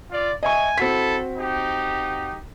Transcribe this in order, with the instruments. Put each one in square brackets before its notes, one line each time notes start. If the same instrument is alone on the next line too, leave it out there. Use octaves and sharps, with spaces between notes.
[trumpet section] F4 D5
[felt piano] D#5 E5 C#6 [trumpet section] G#5
[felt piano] C4 F#4 B6 [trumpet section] E4 A4
[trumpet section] D#4 G4